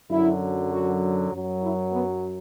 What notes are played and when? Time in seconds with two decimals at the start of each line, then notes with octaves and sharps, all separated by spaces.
0.10 F#2 D3 F#3 E4
0.71 F#4
1.32 F#2 F#3
1.62 E4
1.92 B3